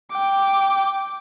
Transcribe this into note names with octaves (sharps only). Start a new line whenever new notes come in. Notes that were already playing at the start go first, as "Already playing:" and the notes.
G5 D6